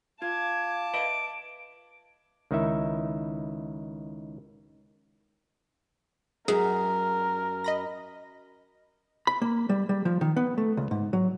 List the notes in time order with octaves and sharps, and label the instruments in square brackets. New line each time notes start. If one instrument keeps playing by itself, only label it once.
[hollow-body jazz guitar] F4 [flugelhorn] F5 [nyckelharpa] A5 D6 [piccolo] G#6
[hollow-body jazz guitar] B4 D#5 E5 [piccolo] D7
[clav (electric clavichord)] C#2 D#3 D#4 E4 E5
[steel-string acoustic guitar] F#2 [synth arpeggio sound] G#4 [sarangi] A#4
[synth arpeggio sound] D#5 B5 A#6
[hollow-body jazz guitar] B5
A#3
G3
G3
F3
D#3
B3
A3
C#2
G#2
F#3